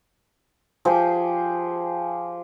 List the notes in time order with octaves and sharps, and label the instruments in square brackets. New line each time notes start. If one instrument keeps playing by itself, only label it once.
[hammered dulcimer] F3 G4 G#4 C5